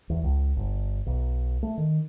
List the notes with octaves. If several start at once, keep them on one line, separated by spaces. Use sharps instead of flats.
E2
C#2
G1
B1
A3
D#3